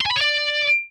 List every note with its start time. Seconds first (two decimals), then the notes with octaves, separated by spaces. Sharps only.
0.01 C6
0.06 G#5
0.11 B5
0.16 C#5
0.21 D5